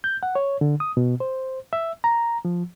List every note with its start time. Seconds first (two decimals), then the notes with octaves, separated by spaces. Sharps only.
0.04 G6
0.23 F#5
0.35 C#5
0.61 D3
0.80 D#6
0.97 B2
1.20 C5
1.73 E5
2.04 A#5
2.45 F3